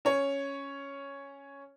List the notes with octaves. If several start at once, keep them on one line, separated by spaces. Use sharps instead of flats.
C#4 C#5